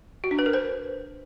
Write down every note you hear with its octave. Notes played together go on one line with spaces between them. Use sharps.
F#4
D4
B4
A#4
C5